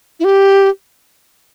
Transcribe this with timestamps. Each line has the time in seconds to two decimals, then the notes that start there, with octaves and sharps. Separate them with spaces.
0.20 E4
0.24 G4